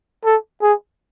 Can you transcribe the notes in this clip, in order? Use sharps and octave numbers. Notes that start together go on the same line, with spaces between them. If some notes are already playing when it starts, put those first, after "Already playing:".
A4
G#4